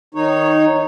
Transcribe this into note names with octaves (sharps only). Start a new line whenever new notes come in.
D#3 D#4 C#5